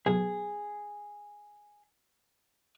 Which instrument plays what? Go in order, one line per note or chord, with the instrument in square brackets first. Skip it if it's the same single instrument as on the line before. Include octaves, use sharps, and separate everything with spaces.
[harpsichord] B1 [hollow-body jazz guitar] G#4